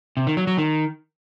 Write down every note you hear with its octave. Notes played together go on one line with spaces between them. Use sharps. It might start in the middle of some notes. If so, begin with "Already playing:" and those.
C3
D#3
F#3
F#3
D#3